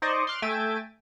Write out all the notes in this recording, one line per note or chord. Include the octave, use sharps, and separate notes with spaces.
D#4 C5 D5 D#5 C#6
C6 D6 F6 F#6
A3 E5 G5 G#5 A6 D7